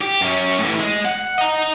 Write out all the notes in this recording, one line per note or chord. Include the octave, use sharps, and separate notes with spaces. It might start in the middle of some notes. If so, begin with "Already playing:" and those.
G4
F#2 C#4
A2 E3
G#3
F#5
D#5 A#5